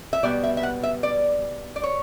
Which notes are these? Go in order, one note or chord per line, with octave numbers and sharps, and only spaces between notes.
E5
B2 G3 B3 D5
E5
E5
F#5
E5
D5
D5
C#5